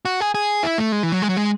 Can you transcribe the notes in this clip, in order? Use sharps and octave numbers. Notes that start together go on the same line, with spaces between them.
F#4
G#4
G#4
E4
A3
G#3
E3
F#3
G#3
F#3
G#3